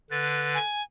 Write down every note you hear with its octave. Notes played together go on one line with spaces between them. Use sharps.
D3 B4 A6
G#5